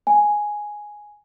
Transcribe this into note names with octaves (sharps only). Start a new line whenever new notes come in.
G#5